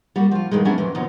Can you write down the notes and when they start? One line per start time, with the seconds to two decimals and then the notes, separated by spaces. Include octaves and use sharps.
0.16 G3 A#3 F#4
0.31 F3 F4
0.51 G2 A#2 D#3 G#3
0.65 F#3 G3 B3 C#4 D4 E4
0.78 F2 E3
0.95 D#2 B2 F3 D#4